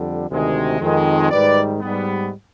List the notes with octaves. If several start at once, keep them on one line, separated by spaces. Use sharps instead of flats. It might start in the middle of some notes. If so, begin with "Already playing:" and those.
Already playing: F2 D3 G3
D2 C3 D#3 G#3
F2 D#3 G#3
G#2 D#3 G3 B4 D5
G#2 G3 B3